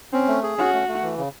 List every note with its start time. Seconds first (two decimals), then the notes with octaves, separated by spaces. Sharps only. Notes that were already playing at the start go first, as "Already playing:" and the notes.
0.13 C4 C#4
0.28 A3
0.43 G#4
0.58 C#4 F#4
0.73 A3
0.88 A3
1.03 E3
1.17 C#3